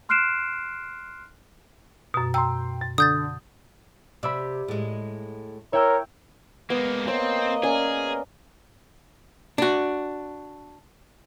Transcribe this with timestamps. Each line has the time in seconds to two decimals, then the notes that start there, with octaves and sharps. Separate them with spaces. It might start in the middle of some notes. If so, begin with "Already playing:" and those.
0.09 C6 F6 F#6 C7 D7 E7
2.14 F#2 B2
2.34 G5 A#5 C6 E6
2.81 A6
2.98 D3 D#6 G6 A6
4.23 C3 D5 E5 B5
4.68 A2 G#3
5.73 E4 A#4 C#5 G5 E6
6.70 G#3 A#3 B3
7.07 A#3 C4 C5 C#5 D#5 D#6
7.63 C#4 G#4 A#4 D5
9.58 D4 F#4